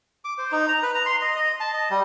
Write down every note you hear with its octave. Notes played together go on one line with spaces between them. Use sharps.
D6
C5
D#4
A#5
B4
A#5
C6
D#5
D#5
A5
D#5
G3